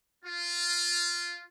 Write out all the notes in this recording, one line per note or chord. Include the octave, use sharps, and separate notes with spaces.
F4